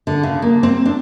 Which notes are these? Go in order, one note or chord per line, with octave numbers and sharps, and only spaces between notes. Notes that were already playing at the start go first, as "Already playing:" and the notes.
D3
C#3
A#3
C4
D4